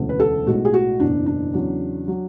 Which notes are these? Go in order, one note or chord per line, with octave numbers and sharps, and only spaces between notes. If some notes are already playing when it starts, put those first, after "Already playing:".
Already playing: E1 D2 C#3
B4
A4
B1 A2 G#3 F#4
G#4
F#4
F#1 E2 B2 D4
D4
E2 C#3 F#3
F#3